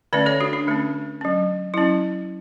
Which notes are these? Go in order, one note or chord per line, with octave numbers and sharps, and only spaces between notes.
D3 A3 C#4 B4 D5
A4 C#5
D4 F#4
D4
D3 A3 C#4
F#3 C#4
F#3 C#4 E4